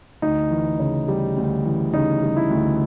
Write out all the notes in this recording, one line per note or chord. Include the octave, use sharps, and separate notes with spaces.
D2 D#4
E3
C#3
G3
D2
E3
C#3 D#4
G3
E4
D2